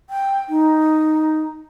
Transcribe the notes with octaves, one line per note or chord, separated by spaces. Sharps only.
G5
D#4